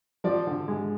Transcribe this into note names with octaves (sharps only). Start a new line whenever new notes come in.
F3 D5
D3
G#3